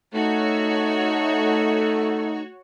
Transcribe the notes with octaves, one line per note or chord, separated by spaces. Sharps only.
A3 D#4 F#4 C#5